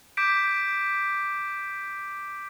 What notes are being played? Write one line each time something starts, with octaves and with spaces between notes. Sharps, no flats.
D6 G6 B6 D7